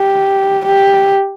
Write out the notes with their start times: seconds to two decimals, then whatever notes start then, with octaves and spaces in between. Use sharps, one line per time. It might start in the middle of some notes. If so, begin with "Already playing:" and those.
Already playing: G4
0.65 G4